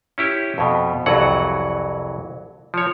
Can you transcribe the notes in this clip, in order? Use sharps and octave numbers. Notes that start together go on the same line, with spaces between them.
C#4 E4 G4
F2 B2
C2 F2 E3 F#3 F#5
F3 C#5